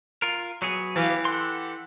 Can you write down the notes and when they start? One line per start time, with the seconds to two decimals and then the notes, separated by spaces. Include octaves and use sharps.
0.22 F4 A#4
0.62 F#3 B3 G#4
0.96 E3 G4 F5
1.25 G4 A4 F#5 C6